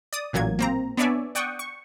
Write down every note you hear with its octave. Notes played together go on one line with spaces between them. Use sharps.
D5 D#6
A1 A#2 F#3 A#3 G#6
A#3 C4 A#5
B3 D4 C#5 D5 E5 G#5
D5 F#5 G5 C#6 D#6
C#6